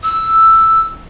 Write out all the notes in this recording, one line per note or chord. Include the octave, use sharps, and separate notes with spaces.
E6